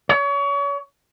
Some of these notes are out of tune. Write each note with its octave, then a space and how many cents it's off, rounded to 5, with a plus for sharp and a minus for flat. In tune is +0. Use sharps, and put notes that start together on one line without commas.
C#5 +35